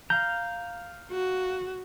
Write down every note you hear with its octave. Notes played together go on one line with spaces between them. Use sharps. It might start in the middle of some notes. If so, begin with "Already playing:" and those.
F5 A#5 G6
F#4